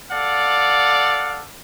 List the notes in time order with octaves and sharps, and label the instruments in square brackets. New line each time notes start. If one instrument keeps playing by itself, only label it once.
[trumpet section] A4 D5 F5 F#5